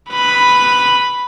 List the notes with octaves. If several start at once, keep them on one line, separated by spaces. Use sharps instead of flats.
B4 B5